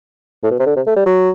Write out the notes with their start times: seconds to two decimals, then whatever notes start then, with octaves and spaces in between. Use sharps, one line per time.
0.43 A2
0.51 B2
0.60 C3
0.66 D3
0.76 C3
0.86 A3
0.96 G3
1.06 F#3